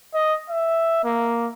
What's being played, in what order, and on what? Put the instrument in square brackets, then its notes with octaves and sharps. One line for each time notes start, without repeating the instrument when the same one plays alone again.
[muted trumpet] D#5
E5
A#3